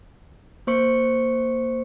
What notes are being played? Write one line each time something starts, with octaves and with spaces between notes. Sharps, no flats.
A#3 C5 C#6 C#7